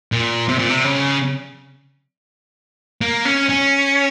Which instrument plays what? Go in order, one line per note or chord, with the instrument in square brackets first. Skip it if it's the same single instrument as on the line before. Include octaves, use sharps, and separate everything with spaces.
[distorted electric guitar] A#2
C3
A#2
C3
C#3
A#3
C#4
C#4